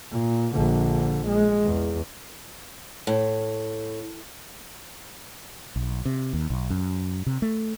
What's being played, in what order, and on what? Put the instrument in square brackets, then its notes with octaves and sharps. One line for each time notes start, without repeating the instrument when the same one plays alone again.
[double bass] A#2
A#1 D3
G#3
E2
[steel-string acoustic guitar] A2
[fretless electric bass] B1
C3
D#2
B1
F#2
C3
A3